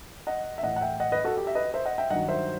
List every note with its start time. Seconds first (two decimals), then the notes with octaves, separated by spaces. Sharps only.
0.27 D#5 F#5
0.58 E5
0.63 A2 E3 D#5 F#5
0.76 F#5
0.81 E5 G5
1.00 D#5 F#5
1.12 B4 D#5
1.24 F#4 A4
1.37 G4
1.47 E5
1.55 B4 D#5
1.74 C5 E5
1.85 D#5 F#5
1.98 E5 G5
2.10 G2 D#3 F#3 D#5 F#5
2.28 C5 E5